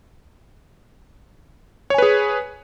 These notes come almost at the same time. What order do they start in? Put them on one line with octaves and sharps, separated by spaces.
C#5 G#5 B4 G#4